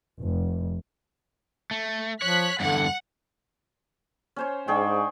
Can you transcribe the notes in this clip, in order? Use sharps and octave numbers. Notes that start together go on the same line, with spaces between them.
F1
A3
F3 C#5 F#6 B6
E2 G2 D3 F#5
C#4 C5 C#5
G#2 D4 G#4 G5 C#6